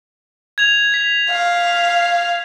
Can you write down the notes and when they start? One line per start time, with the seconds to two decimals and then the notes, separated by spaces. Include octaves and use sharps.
0.58 G#6 F7
0.92 G#6 B6
1.30 F5